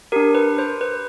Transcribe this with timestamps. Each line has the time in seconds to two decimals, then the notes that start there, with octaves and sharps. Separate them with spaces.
0.12 D4 G4 A#4
0.35 B4
0.58 C5
0.81 B4